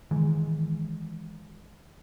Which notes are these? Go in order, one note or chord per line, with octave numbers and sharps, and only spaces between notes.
D#3 E3 G#3